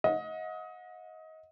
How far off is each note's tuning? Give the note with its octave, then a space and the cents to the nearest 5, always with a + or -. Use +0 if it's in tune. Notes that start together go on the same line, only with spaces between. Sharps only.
D#5 +25 F#5 -40